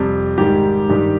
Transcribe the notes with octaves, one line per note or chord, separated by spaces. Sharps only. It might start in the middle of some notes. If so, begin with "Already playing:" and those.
Already playing: F2 C3 G3
G#2 D#3 G3 G4
G2 D#3 G3